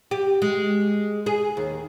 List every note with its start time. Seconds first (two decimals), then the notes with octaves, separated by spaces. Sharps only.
0.11 G4
0.42 G#3
1.26 G#4
1.57 D#2